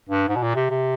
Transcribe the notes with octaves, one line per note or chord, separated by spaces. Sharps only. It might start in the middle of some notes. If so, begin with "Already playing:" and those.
G2
G#2
B2
A#2
C3
C3